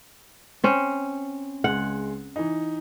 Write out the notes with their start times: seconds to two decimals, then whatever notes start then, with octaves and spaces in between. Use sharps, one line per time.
0.64 C4 C#4
1.64 C#2 G#3 F#5
2.36 E3 D#4